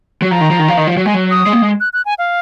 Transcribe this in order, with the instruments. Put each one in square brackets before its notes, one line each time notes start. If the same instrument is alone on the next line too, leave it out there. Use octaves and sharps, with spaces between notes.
[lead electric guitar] F#3
[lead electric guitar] F3 [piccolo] A#5
[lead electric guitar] D#3
F3
D#3
F3
D#3
F3
F#3
[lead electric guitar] G#3 [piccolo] G#5
[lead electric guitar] F#3
[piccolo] D#6
[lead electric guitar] G#3
A#3
G#3
[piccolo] F#6
F#6
G#5
F5